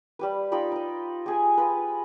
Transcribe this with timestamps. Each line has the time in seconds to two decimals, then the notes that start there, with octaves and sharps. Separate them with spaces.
0.19 G3 G4 B4
0.52 D#4 F4 G4 B5
0.72 D#4 D#5
1.26 G4 G#4 G#5
1.58 F4 B4